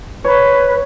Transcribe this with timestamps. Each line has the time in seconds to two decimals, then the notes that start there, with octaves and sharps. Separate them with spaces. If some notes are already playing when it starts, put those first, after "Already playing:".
0.24 B4 C#5